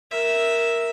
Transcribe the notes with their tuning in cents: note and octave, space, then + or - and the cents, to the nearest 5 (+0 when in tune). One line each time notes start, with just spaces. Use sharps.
A#4 +0 E5 -5